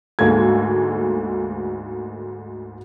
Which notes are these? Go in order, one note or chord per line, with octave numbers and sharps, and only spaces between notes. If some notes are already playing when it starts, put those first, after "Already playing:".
D2 G#2 A#3 A4 G#6